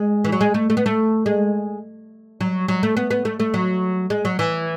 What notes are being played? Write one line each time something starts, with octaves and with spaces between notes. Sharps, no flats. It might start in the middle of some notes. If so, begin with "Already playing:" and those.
Already playing: G#3
E3
F#3
G#3
A3
A3
B3
A3
G#3
F#3
F#3
A3
B3
B3
A3
A3
F#3
G#3
F#3
E3